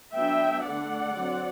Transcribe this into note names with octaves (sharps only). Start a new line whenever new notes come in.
F#3 B3 D4 E5 G5
D3 A3 D4 D5 F#5
F#3 C4